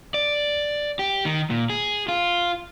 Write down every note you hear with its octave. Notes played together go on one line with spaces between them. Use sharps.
D5
G4
D#3
A#2
G#4
F4